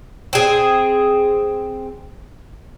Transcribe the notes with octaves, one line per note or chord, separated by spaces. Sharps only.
C4 G#4